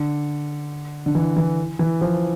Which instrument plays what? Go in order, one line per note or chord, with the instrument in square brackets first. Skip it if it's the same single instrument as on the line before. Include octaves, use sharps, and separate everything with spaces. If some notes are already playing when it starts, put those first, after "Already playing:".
Already playing: [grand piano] D3
D3
E3
E3
E3
F3